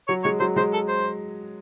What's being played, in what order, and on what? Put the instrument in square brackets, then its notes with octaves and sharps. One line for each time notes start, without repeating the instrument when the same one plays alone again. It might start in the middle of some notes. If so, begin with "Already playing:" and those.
[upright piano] F#3 [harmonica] C#5
[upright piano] G#3 [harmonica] C#5
[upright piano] F#3 [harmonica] C5
[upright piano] G#3 [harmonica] C5
[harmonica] A4
C5